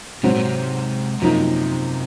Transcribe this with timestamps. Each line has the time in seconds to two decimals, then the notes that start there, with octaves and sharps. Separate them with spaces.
0.23 G#2 C3 F#3 C4 F#4
0.34 A#2
0.44 C3
1.21 F#2 C3 F3 A#3 D#4